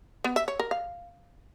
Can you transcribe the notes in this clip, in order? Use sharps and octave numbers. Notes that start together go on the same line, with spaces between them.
B3
E5
C#5
A#4
F5